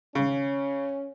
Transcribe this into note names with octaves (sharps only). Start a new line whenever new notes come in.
C#3 C#4